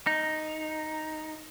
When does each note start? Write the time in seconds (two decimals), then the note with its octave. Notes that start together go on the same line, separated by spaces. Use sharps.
0.07 D#4